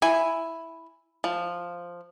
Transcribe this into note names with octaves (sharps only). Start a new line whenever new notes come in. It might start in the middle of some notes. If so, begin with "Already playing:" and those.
E4 G#5
F3